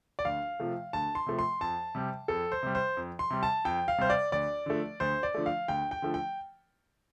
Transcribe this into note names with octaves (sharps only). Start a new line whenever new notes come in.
D5
D2 F5
C3 F3 A3
D2 A5
C6
C3 F3 A3
C6
F2 A5
C3 G3
F2 A4
C5
C3 G3
C5
F2
C6
C3 G3
A5
F2 G5
F5
C3 G3 C5
D5
D2 D5
D3 F3 A3
D2 C5
D5
D3 F3 A3
F5
D2 G5
G5
D3 F3 A3
G5